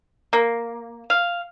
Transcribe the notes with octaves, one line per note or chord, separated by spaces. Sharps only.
A#3
F5